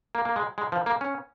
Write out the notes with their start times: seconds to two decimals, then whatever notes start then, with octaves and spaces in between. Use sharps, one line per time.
0.15 A#3
0.25 A#3
0.36 G#3
0.58 G#3
0.72 F3
0.86 A#3
1.01 C#4